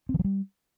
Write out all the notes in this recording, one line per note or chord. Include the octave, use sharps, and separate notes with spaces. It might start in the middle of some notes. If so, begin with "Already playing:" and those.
C4
E3
F#3
G3